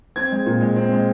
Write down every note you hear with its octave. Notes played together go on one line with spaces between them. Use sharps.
C4 G#6
G#3
A#2
G#3
C4
G#3